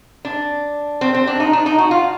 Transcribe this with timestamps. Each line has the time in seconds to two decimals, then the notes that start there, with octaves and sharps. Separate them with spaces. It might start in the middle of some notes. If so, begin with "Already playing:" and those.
0.25 D4
1.01 C4
1.14 C4
1.27 D4
1.40 D#4
1.53 D4
1.66 D#4
1.78 F#4
1.91 F4